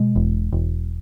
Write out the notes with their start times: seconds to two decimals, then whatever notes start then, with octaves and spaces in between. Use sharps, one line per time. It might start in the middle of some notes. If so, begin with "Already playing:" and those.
Already playing: B2 G#3
0.16 E1
0.52 E1